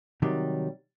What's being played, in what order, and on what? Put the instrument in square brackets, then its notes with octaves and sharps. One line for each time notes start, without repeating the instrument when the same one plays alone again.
[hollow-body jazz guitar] C3 D#3 F#3 G3 G4